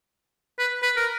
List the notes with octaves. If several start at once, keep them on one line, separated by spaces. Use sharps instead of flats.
B4
B4
A#4